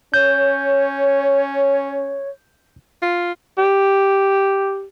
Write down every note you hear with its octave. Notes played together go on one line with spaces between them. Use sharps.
C#4 C#5 G6
F4
G4